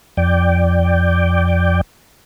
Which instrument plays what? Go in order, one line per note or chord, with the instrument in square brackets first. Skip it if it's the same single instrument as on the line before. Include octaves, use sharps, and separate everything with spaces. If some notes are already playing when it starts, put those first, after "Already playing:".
[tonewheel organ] F2 D5 G5